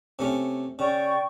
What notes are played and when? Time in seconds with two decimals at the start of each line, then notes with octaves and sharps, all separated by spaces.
0.19 C3 A3 C#4
0.79 C#3 D5 G5 C#6